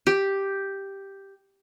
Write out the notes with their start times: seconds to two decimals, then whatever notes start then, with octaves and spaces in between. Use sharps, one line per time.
0.07 G4